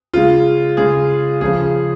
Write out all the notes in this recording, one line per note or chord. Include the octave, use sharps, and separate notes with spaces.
C#3 G#3 F4
C#3 G#3 G#4
C#3 F3 G#3 G#4